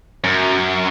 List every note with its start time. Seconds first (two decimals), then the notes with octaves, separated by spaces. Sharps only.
0.24 F#2